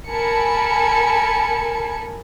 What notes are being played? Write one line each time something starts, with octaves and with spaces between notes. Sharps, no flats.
A4 A#4 G#5 A5 B5 C#7